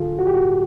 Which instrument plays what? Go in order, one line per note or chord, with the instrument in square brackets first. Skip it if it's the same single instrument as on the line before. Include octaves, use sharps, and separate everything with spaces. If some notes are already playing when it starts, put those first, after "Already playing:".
Already playing: [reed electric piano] D3 F4 G#4 A4
F#4
G4
F#4